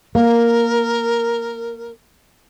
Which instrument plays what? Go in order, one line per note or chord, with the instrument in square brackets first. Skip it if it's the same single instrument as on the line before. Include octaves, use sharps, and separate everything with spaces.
[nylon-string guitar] A#3 [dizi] A#4